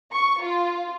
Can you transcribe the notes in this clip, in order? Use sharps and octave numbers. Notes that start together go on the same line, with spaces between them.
C#6
F4